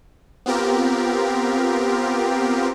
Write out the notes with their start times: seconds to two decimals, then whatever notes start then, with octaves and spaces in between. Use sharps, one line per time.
0.46 B3 C4 F4 G4 A#4